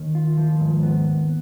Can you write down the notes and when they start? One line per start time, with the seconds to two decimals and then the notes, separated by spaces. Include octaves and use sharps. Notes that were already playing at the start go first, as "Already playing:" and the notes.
Already playing: D#2 D#3
0.15 F4
0.37 F3
0.60 G#2
0.83 B3